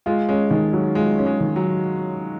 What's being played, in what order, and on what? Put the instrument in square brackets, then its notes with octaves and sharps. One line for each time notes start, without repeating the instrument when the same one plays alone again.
[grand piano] G#3 [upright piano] F4
[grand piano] G#3 [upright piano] C#4
[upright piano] D#3 [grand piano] G#3
[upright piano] F#3
[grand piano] G#3 [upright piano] F4
[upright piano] C#4
[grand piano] G#3
[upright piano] D#3
[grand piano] F#3